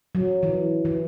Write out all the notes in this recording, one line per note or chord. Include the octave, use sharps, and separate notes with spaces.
F#3
E3
E3